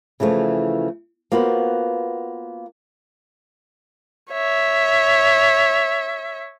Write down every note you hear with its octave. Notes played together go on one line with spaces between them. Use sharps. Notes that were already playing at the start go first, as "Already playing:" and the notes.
C#3 E3 F3 A3
A#3 B3 F4 F#4 B4 C5
C#5 E5